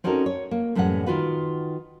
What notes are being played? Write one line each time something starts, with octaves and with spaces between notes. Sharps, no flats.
C4 C#4 D#4 F#4 A4 A#4
C#5
A#3
F#2 A2 E3 G3 C#4 F#5
D#3 F4 F#4 B4 F#5